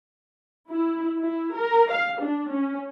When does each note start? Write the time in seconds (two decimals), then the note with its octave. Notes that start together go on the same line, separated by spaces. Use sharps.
0.69 E4
1.18 E4
1.55 A#4
1.90 F5
2.21 D4
2.51 C#4